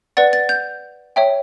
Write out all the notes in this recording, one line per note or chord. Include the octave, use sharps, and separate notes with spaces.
B4 D5 F#5 A6
A6
G6
C#5 E5 G5